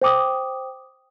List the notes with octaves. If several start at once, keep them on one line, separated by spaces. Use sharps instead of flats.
C5 G5 D6 D#6